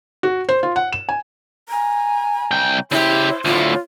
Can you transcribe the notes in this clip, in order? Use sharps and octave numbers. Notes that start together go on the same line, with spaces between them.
F#4
C5
F4
F#5
E7
G#5
G#5 A#5
C2 G5
C#3 E4 G4 C5
D2 A2 F4